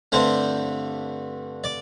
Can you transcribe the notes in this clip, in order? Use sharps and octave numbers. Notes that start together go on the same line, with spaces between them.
G2 D3 A3 C4 C5
D5